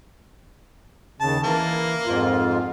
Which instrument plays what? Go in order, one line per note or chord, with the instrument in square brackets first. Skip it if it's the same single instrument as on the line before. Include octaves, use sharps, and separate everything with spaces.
[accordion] D#2 C#3 [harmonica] A5
[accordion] E3 [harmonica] A#3
[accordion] F2 G#2 F4